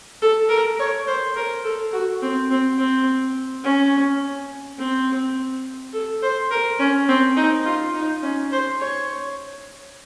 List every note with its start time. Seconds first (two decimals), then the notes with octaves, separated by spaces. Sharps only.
0.22 A4
0.49 A#4
0.79 C#5
1.07 C5
1.36 A#4
1.64 A4
1.93 F#4
2.22 C4
2.50 C4
2.78 C4
3.64 C#4
4.79 C4
5.93 A4
6.23 C5
6.51 A#4
6.79 C#4
7.09 C4
7.37 D#4
7.65 F4
7.94 D#4
8.23 C#4
8.52 C5
8.80 C#5